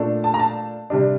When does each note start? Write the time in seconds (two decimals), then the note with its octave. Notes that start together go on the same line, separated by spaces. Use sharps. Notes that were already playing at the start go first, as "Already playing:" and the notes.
Already playing: A#2 A3 D4
0.24 A5
0.34 A#5
0.40 A5
0.90 C3 G3 D4